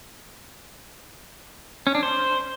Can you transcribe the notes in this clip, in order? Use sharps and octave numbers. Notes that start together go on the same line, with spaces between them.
C#4
D4
C5